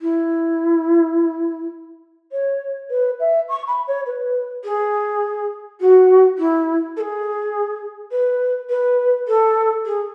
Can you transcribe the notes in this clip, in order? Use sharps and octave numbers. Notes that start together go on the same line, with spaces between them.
E4
C#5
B4
E5
C#6
B5
C#5
B4
G#4
F#4
E4
A4
G#4
B4
B4
A4
G#4